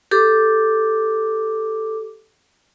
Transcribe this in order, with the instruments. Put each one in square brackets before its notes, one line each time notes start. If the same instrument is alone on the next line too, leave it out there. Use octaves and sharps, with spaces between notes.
[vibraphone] G4 A4 D6